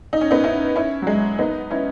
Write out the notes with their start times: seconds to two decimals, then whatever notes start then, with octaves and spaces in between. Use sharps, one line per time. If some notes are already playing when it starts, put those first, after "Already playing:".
0.13 D#4
0.21 C#4
0.31 B3 D#4
0.44 C#4 E4
0.76 C#4 E4
1.02 F#3
1.07 G#3
1.38 B3 D#4
1.71 C#4 E4